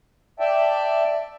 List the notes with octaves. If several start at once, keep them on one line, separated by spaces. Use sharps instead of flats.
D5 E5 G5 A5